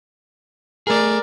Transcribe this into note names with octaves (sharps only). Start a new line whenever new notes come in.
A3 G#4 A#4 D5